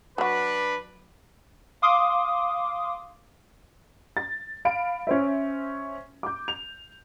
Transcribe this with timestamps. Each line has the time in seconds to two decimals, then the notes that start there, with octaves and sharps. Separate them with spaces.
0.18 F#3 D4 F#4 B4
1.82 F5 C6 D6 D#6
4.17 A6
4.65 F5 B5 D7
5.07 C#4 C5 E5
6.23 D6 G6
6.48 F7